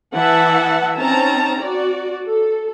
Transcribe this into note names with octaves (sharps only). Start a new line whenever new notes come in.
E3 E5 F#5 A5
C4 C#4 D#4 A5 A#5
F#4 D5
A4